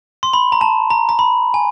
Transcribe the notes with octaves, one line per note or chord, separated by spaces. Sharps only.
C6
B5
A#5
A5
A#5
A#5
B5
G#5